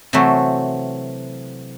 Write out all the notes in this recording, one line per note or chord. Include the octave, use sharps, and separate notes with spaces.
C3 E3 F#3 A3 F#4 C5